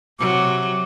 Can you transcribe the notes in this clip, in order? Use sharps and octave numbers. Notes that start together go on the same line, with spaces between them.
C3 F#3 D6